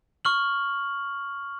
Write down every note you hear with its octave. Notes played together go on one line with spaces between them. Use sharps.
C#6 F6 F#7